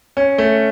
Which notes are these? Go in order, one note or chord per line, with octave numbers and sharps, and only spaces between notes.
C#4
A3